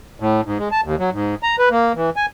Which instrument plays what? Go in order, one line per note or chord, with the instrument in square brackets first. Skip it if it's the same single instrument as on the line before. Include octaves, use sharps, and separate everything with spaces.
[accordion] A2
G#2
G#3
A5
D#2
F#3
G#2
A#5
B4
A#3
E3
G#5